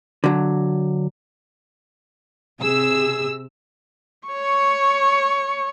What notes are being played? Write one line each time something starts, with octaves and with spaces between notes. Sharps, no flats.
D3 F#3
C3 G#4 E6
C#5 C#6